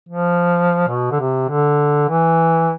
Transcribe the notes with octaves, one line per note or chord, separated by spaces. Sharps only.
F3
B2
D3
C3
D3
E3